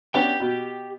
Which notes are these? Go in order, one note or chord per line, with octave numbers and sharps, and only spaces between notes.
B3 C#4 D4 G4 G5
B2